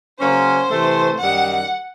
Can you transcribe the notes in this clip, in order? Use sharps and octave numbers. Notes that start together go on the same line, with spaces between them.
C#3 F#3 A#3 C#4 C5
C3 E3 A3
F#2 D#3 G3 F#5